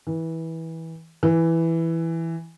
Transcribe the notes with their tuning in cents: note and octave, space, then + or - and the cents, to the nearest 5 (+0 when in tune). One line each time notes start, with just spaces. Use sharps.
E3 -20
E3 +0